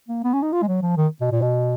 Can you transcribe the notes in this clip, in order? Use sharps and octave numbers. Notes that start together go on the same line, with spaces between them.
A#3
B3
C#4
D#4
F4
G#3
F#3
F3
D#3
B2
A#2
B2